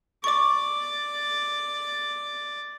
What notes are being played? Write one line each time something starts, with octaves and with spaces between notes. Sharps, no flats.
D5 C#6 D6